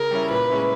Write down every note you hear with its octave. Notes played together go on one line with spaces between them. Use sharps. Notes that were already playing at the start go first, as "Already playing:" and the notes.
Already playing: C#3 A#4
G3 C#4 E4
A#2 B4
G#3 C#4 E4